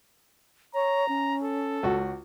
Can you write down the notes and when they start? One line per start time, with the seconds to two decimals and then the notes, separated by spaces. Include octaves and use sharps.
0.74 C#5 A#5
1.08 C#4
1.43 A4
1.83 C#2 F#4